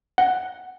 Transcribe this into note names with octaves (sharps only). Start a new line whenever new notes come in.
F#5